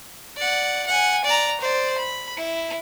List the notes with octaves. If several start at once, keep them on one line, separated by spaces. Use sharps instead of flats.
D5 F#5
F#5 G#5
D5 A#5
C5 D5
B5
E4